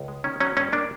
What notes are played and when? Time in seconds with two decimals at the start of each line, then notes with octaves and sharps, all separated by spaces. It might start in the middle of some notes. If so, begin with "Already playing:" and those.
Already playing: C#2
0.08 G#3
0.24 D#3 C#4
0.40 F#3 C#4
0.57 G2 C#4
0.72 A#3 D4